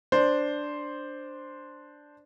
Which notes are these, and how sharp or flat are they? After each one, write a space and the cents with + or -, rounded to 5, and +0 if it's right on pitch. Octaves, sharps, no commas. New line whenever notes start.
D4 +0 C5 +0